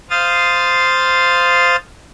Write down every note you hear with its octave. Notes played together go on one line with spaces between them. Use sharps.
C5 F5 D#6 A6